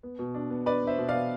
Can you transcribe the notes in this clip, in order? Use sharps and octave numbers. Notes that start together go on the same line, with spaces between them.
B3
B2
D4
B3
D4 B4 D5
D4 C5 E5
B2
D5 F5
B3